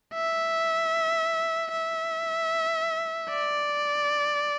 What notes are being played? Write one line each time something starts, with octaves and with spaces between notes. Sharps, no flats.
E5
E5
D5